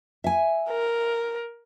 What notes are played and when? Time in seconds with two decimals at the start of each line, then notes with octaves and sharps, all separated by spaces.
0.24 E5 G#5
0.70 A#4